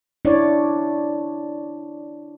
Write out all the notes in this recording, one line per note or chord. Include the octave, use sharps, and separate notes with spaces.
D4 E4 C#5 D5